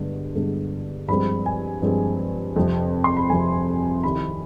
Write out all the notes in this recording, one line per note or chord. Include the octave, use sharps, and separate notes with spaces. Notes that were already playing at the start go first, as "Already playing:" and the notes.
Already playing: G2 D3 G#3 B3
G2 D3 G#3 B3
G2 F3 G#3 C4 B5
G#5
G2 F3 G#3 C4
F2 C3 F3
C6
B5
F2 C3 F3 G#5
C2 C3 D#3 G3 B5